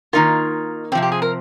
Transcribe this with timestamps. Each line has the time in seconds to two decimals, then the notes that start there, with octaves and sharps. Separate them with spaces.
0.13 D#3 A#3 D#4 F4 A#4
0.92 C4 G4
0.95 C3 F3
1.03 G4
1.12 G#4
1.22 A#4